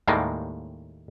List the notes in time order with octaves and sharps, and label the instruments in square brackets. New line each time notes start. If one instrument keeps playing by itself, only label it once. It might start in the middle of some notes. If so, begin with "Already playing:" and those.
[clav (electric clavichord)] D#2 A2 D#3 G3 G#3 A#3